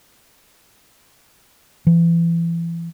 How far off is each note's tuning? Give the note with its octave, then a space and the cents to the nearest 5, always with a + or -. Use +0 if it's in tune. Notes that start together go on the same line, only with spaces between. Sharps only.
E3 +30